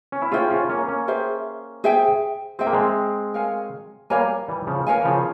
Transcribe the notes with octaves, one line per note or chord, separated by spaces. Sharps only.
C#4
E4
C#4 F4 G#4 C5 E5 G5
C#4 F4
A#3 C#4
A#3 C#4
G#4 C5 E5 G5
G#4 C5 E5 G5
C4 G#4 C5 E5 G5
A#3
G#3 C4
A#4 C#5 F5 G#5
G3 A#3 A#4 C#5 F5 G#5
E3 G3
C#3 F3
A#4 C#5 F5 G#5
E3
C#3 F3